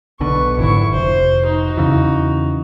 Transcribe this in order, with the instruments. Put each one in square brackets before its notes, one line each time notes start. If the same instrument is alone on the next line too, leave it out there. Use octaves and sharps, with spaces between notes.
[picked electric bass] B1 B2 D3 [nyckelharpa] B4 C#6
[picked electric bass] G#1 F2 D3 [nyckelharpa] E4 C#6
[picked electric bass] F1 [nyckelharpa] C5
[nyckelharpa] D#4 F#4
[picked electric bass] E2 C#3 E3